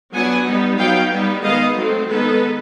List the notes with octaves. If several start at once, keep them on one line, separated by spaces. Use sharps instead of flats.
F#3 B3 D4 F#5 G#5
G3 B3 D#4
F#3 B3 D#4 F5 G5
G3 B3 D#4
D#3 G#3 B3 D#4 D#5 F5
F#3 A3 C4
D#3 G#3 B3 D#4 A4 B4